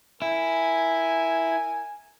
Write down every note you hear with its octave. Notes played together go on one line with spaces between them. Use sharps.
E4 A#4 G#5